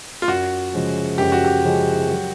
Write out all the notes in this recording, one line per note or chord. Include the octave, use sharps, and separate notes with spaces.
F4
F#2 F#4
C#3 F3 G#3
F#2 G4
F#4
G4
C#3 F3 G#3
F#3